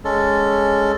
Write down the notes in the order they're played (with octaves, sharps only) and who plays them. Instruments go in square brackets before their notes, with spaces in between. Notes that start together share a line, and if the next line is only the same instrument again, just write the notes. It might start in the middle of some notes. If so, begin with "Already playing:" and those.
[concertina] G#3 C#4 A4